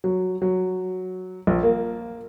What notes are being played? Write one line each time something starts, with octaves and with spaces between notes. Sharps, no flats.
F#3
F#3
A#1
A#3